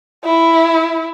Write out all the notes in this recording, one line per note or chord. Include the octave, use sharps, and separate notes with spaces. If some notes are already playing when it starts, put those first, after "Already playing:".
E4